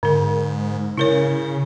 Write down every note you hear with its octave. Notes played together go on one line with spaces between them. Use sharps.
G#2 D3 A#4
C#3 E4 A#4 C#5